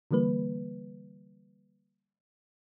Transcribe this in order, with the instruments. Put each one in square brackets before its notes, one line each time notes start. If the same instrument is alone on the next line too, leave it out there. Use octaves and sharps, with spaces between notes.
[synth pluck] D3 E3 G3 A#3 B4